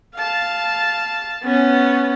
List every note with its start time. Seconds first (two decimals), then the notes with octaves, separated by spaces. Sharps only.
0.16 F5 A5
1.43 B3 C#4